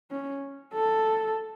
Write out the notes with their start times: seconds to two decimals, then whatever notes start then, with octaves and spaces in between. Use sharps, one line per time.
0.11 C#4
0.74 A4